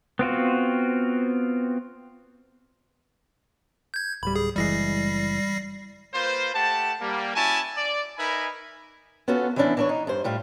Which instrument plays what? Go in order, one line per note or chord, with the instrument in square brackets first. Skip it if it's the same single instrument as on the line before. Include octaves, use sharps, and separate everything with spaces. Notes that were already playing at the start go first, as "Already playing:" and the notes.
[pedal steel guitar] B3 C4 F4 F#4
[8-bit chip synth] G6 G#6
[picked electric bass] D1 G3 [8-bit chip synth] B5
[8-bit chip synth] G#4
[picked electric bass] F#1 E3 G#3 [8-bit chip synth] G3 A#6 C7
[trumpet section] A#3 F4 B4 C5
A3 G4 F#5 A5
G3 A#3
C#4 E4 F#4 G#5 A5
D5
D#4 A#4 B4 E5 G#5 B5
[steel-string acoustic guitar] B3 C#4 F4 F#4 A4
E3 F3 B3 C#4 D4 E4
E3 D4 C#5
D#4
G2 C5
A2 G3 F4